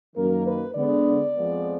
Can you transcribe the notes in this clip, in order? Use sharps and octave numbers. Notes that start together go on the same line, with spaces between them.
F#2 D#3 A#3 A#4
B4
D3 G#3 B3 D5
F2 F3 G#3 B3